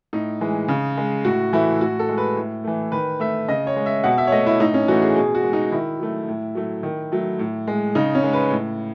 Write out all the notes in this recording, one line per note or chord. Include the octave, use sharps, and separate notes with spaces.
A2 D#4
E3 G#3
C#3
G#3
A2 F#4
E3 A3 E4
A2 F#4
A4
G#3
B4
A2
E3 A3
D#3 B4
A3 E5
C#3 D#5
C#5
G#3
E5
B2 F#5
E5
C#5
A3 D#5
E4
A2 D#4
C#4
E3 A3 F#4
G#4
B2 G#4
F#4
G#3
D#4
D#3 E4
F#3 A3
A2
F#3 A3
D#3
F#3 A3
A2
G#3
C#3 D#4
C#4
G#3
B4
A2